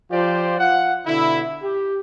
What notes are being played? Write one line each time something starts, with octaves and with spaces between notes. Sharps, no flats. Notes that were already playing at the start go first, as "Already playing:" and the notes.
F3 F4 G4 C5 D5
F4 F5 F#5
B2 D3 E4
G4